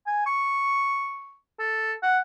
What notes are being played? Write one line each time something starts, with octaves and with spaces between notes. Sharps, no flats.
G#5
C#6
A4
F#5